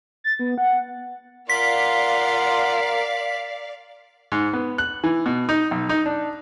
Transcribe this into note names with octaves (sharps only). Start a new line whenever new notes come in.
A6
B3
F#5
F4 A#4 D5 F5 F#5 C6 B6
G#2
B3
F#6
E3
B2
D#4
B1
D#4
D4